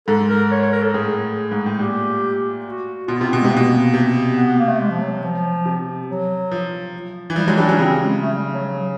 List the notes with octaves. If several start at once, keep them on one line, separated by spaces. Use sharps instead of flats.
G#2 A4
A#4
C#5
C#5
A#4
A4
A2 G#4
G#2
A2
A#2 G4
F#4
B2 F4
C3 F4
C4
B2
G#3
C3
A#3
B2
C3
B3
B3
A#3
A3
G#3
F3
F#3
F#3
F3
C3
F#3
F3
E3
F3 G3
F#3 G#3
G3 D4
F#3 C#4
C#3 C4
G#3
A3
G3
F#3
F#3